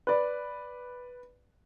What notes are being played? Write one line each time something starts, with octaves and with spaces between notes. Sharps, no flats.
B4 D5